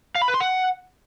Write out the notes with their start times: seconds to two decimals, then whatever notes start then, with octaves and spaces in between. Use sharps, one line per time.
0.15 F5
0.22 B5
0.28 B4
0.34 C6
0.40 F#5